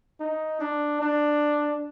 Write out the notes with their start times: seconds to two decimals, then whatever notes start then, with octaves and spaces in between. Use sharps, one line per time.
0.20 D#4
0.61 D4
1.01 D4